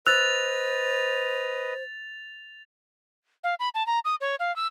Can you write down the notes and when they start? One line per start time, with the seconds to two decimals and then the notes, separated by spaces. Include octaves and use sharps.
0.07 B4 C5 D#5 E6 F#6 A6 F7
3.44 F5
3.60 B5
3.75 A5
3.87 A#5
4.05 D#6
4.21 C#5
4.40 F5
4.56 E6